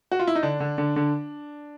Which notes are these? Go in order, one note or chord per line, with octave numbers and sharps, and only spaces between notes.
F#4
F4
E4
D#4
D3 D4
D3
D3
D3